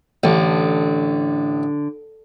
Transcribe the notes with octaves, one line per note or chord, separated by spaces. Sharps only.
A1 D3